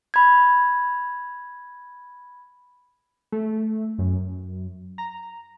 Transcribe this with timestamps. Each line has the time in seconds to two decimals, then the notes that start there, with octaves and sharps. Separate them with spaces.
0.14 B5 G#6
3.32 A3
3.98 F#2
4.98 A#5